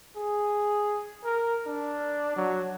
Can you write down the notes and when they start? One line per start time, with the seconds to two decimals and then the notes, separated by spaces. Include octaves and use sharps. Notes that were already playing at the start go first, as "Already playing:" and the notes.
0.16 G#4
1.24 A#4
1.66 D4
2.36 F#3